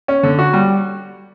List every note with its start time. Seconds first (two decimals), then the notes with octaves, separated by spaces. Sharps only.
0.08 C#4
0.23 D3
0.39 F#4
0.53 G3